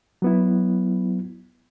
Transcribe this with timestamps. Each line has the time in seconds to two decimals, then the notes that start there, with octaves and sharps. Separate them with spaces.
0.22 F#3 B3 E4